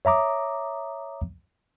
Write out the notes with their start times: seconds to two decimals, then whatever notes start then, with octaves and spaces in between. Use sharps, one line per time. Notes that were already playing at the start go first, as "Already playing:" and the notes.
0.05 C#5 E5 A#5 D6 D#6